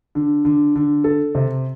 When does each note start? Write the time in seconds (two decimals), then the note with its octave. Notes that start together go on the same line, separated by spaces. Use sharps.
0.15 D3
0.45 D3
0.76 D3
1.04 A4
1.35 C3